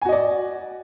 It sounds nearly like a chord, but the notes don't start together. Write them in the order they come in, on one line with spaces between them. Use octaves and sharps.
G#5 F#4 D#5 D5